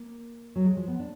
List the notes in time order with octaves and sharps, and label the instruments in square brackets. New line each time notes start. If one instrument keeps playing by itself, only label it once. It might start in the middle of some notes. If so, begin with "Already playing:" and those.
Already playing: [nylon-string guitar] A#3
F#3
G#3
F3
B3
D4